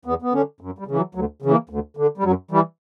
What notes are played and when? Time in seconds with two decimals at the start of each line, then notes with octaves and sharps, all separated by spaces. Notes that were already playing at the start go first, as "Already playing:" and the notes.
0.05 E2 B3
0.22 B3
0.33 D3 C#4
0.61 F#2
0.79 G3
0.87 C#3 E3
0.97 F#3
1.15 D2 F#3
1.42 C#3 E3
1.51 A#3
1.69 D2
1.97 D3
2.18 G3
2.24 F#2 F#3
2.51 E3 G3